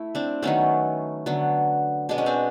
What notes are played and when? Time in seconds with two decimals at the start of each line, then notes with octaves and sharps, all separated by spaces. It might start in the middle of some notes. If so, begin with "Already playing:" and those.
Already playing: A3 E4
0.15 C4 D4
0.42 D#3 F#3 A3 B3 C#4
1.26 D3 F#3 B3
2.09 B2 G#3 B3 D4
2.18 C#4
2.26 C4 D4